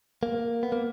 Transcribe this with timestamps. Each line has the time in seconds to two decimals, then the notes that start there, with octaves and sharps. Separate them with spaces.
0.23 A#3
0.63 B3
0.72 A#3